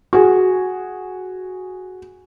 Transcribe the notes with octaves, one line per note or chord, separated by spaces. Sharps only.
F#4 G#4